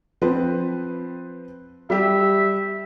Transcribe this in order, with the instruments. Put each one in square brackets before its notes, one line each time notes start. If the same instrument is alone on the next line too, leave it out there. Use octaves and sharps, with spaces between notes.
[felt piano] F3 C4 B4
[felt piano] G3 G4 [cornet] E5